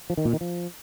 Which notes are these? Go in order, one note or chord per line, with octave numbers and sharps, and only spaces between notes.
F3
D#3
A#2
D#3
F3